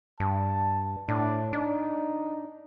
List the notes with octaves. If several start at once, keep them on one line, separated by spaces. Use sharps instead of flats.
G2 A5
A2 D4
D4 D#4